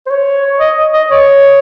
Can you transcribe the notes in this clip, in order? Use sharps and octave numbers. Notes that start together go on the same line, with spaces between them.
C5
C#5
D#5
D#5
C#5